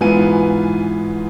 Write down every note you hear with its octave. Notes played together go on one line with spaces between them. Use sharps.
G#2 E3 B3 F4 G#5 D#7